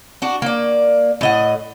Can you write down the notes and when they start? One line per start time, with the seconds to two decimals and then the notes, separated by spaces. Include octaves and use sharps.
0.22 D4 F#4
0.42 A#3 D5
1.21 A2 D#5 F#5